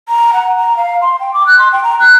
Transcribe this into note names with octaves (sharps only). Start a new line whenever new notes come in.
A#5
F#5
A#5
F5
C6
G5
D6
F#6
C6
G5
A#5
F#6